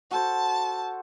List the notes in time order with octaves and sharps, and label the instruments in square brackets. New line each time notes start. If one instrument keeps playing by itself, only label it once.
[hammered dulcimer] F#4 A4 C5 [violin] A5